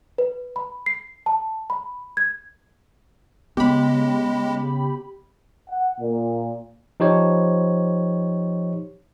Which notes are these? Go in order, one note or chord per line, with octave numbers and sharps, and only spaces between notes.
B4
B5
C7
A5
B5
G#6
C#3 G#3 B3 G4 B5
F#5
A#2
F3 D#4 G4 C5 C#5